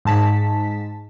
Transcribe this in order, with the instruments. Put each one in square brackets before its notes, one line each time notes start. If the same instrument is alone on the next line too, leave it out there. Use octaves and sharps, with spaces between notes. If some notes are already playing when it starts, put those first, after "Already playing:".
[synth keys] G#2 A5 B6